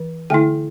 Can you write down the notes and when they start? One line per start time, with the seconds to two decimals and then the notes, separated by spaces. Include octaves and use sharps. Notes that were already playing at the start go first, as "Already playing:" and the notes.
Already playing: E3
0.30 D3 A3 E4 G5